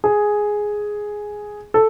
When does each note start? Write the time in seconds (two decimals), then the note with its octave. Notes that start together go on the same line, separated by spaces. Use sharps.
0.04 G#4
1.74 A4